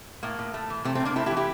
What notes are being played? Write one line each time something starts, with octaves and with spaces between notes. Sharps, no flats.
A2 A#3
A2
A3
E3
C3 A3 C4
A3 C4
C3
A#3 D4
A3 C4 E4
E4 G4
E3
E4 G4